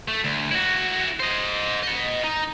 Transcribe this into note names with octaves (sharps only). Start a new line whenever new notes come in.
A3
D2
E4 F#4
C5 D#5
D#5 F#5
D#4